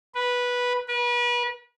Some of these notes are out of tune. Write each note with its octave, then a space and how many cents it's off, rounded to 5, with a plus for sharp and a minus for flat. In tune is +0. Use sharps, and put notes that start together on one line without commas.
B4 -10
B4 -35